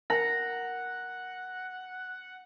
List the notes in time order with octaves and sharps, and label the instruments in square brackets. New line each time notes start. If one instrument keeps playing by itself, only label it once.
[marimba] A#4 [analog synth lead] F#5 [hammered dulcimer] A#5